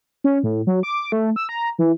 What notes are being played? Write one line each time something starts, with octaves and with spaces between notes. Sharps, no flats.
C#4
A2
F#3
D6
A3
E6
A#5
E3